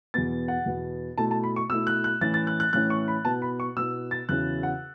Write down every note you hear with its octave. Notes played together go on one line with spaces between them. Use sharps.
E2 B2 B3 A6
F#5
E2 B2 B3
B2 A3 E4 A5
A5
B5
C#6
B2 A3 E4 E6
F#6
F#6
A2 E3 C#4 E4 A6
A6
F#6
F#6
A2 E3 C#4 E4 F#6
C#6
B5
B2 B3 E4 A5
B5
C#6
B2 B3 E4 E6
A6
E2 C#3 F#3 C#4 E4 F#6
F#5